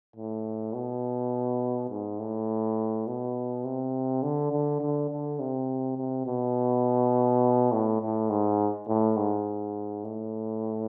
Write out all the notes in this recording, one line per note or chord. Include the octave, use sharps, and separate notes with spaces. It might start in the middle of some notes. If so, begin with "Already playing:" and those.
A2
B2
G#2
A2
B2
C3
D3
D3
D3
D3
C3
C3
B2
A2
A2
G#2
A2
G#2
A2